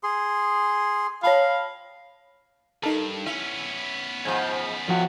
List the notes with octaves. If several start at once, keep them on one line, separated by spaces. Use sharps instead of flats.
G#4 C6
C#5 F5 A5 B5
G2 D#4 A4 A#4
B3 C#4 E4
G#2 F3 G#5 G6
A2 F3 F#4